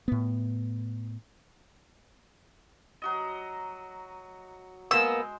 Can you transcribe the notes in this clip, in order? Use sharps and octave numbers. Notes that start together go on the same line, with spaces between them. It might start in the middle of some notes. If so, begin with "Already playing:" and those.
A2 B3
F#3 F#4 D#5
G#3 A#3 B3 C5 E6